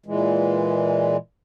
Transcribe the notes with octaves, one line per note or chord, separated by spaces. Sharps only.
A#2 E3 G#3